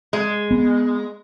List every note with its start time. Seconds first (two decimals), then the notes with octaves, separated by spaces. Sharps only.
0.13 G#3
0.51 B3